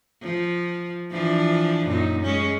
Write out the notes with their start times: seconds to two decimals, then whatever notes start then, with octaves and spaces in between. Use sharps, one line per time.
0.22 F3
1.11 E3 F3 D4
1.86 F#2 A#2 D#4
2.22 G#3 C#4